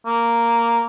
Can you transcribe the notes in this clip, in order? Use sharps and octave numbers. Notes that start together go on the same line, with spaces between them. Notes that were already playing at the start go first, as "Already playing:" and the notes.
A#3